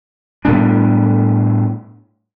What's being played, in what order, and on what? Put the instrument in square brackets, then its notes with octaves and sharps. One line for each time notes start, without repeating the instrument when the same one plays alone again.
[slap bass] A2 G3 B3 D4